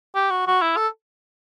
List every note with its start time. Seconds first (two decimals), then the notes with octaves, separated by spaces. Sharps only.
0.15 G4
0.30 F#4
0.47 F#4
0.62 E4
0.77 A4